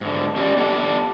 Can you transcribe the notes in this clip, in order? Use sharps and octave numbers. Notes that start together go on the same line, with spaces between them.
G#2 D3
C#4 G4 A#4 C5 D5 D#5
B3 D4 G4 A4